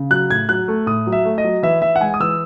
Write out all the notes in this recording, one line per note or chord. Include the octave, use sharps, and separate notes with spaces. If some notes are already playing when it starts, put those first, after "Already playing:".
Already playing: C#3
F#3 F#6
A2 G#6
F#3 F#6
A3
A2 D#6
F#3
E5
A3
D#5
F#3
E3 E5
E3 E5
F#5
G#3 G#5
D#6
E3 E6